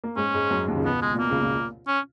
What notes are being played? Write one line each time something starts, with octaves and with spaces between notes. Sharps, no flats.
A#3
G#2 G#3 C#4
G#2 G#3
F#2 F#3
D#2 D#3
C#2 C#3
B2 B3
G#3
A#2
B2 A#3
C#2 C#3
A#2
C#4